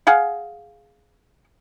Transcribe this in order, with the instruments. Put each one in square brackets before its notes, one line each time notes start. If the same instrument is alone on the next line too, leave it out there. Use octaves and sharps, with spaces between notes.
[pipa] G#4 F5 F#5